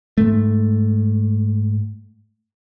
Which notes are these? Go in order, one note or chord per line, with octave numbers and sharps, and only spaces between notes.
G#2 A3